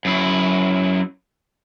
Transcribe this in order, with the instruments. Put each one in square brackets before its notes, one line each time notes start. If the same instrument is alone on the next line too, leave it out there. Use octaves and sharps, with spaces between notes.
[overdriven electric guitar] F#2 E4